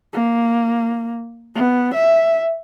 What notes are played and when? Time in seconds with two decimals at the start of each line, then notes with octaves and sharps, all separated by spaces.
0.13 A#3
1.55 B3
1.94 E5